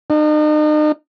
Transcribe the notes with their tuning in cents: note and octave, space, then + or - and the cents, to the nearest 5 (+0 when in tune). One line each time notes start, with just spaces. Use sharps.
D#4 -40